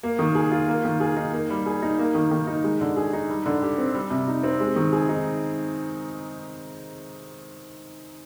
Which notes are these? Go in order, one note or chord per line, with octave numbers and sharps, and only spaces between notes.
A#3
D#3
G#4
F4
A#3
D#3
G#4
D#4
A#3
G3
G#4
D#4
A#3
D#3
D#3
D#4
G#3
D3
G#4
D#4
G3
D3
G4
C4
G3
C3
D#4
C4
G#3
D#3
G#4
D#4